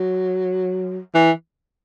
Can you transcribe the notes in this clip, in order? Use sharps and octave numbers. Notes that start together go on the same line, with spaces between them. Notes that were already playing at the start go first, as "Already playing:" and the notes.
Already playing: F#3
E3